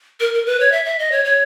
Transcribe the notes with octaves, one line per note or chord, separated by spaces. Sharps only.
A#4
A#4
B4
C#5
E5
E5
D#5
C#5
C#5